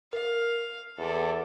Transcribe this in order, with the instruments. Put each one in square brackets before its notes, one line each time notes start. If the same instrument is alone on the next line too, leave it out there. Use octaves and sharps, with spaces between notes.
[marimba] A#4 [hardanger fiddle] F5
[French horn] E2 [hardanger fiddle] A4 D5